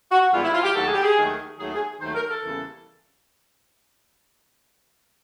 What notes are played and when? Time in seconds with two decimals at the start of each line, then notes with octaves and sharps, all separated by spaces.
0.11 F#4
0.32 G#2 E3 G3 B3 F4
0.43 E4
0.53 F4
0.63 G4
0.75 D#2 D#3 F#3 A3 A4
0.84 G#4
0.93 G4
1.03 G#4
1.17 D#2 D#3 F#3 A3
1.59 D#2 D#3 F#3 A3 G#4
1.73 G#4
2.01 D#2 D#3 F#3 A3 C5
2.15 A#4
2.29 A4
2.43 E2 C#3 E3 G3 A#3